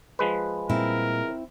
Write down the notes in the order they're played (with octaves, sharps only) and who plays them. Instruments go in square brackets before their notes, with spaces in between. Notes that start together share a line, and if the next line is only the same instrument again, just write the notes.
[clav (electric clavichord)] F3 G#3 B4
[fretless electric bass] A#2 G3 [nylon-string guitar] C4 E4 [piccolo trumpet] A#4